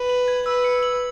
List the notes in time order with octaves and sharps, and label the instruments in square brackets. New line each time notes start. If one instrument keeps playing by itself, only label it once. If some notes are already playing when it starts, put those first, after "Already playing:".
Already playing: [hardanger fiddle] B4
[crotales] F#7
G#6
[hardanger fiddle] B4 [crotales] E6
[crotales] C#7
F#7